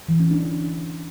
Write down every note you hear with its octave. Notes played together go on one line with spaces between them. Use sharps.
E3
C#4
D4